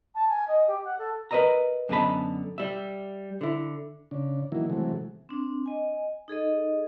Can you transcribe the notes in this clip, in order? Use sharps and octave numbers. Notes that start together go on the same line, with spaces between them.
A5
G#5
D#5
G4
F#5
A4
A#4 B4 C#5 D#5 E5 A#5
F#2 D3 B3 D#5 A5 B5
G3 E5
D3 E4
C#3 D4
D#3 E3 F#3 A#3 E4
C3 E3 F#3 G#3 A3
C4 D4
D#5 G#5
D#4 G#4 A4 D#5